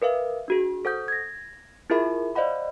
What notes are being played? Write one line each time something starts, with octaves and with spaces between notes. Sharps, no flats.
A#4 B4 E5 F5
D4 F#4 G#4
A4 C5 F#5 D#6 G6
G#6 A#6
E4 F4 G#4 A#4 E5 B5
C5 D5 D#5 F5 F#5 B5